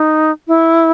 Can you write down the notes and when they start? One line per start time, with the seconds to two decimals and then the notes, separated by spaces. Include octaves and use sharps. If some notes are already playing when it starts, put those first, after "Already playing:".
Already playing: D#4
0.48 E4